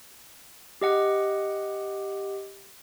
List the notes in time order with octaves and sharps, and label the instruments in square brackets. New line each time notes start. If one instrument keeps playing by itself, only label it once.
[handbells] G4 D#5 F#5